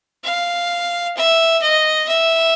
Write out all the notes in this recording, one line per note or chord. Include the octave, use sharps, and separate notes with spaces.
F5
E5
D#5
E5